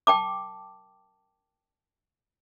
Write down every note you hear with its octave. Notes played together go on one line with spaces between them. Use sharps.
G5 A5 D6